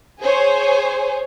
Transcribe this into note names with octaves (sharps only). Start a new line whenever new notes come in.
G#4 C5 C#5 G#5